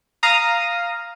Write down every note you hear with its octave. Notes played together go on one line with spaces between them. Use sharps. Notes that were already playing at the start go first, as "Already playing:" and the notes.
F5 A#5 D#6